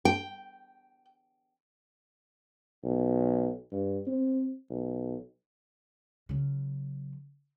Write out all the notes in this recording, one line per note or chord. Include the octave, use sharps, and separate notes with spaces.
G5
B1
G2
C4
B1
C#3 F#3